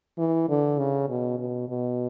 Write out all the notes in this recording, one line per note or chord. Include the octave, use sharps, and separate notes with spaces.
E3
D3
C#3
B2
B2
B2